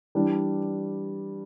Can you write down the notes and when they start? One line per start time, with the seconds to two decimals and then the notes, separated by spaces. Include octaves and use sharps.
0.15 E3 G3 D4